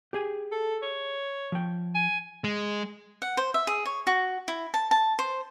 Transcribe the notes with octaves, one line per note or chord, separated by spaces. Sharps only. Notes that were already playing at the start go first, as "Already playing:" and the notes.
G4 G#4 G#5
A4
C#5
F3 G5
G#5
G#3
F#5
C5
E5
G#4
C#5
F#4
E4
A5
A5
C5